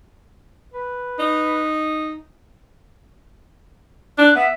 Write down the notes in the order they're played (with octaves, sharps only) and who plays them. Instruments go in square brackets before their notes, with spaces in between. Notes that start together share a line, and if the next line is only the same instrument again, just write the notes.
[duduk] B4
[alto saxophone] D#4
[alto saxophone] D4 [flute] F#6
[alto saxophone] B3 [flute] E5